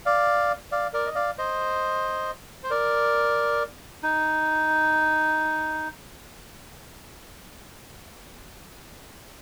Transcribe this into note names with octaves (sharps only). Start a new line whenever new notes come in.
D5 F5
D5 F5
A#4 D5
D#5
D5 F5
C5 D#5
C5
A#4 D5
D#4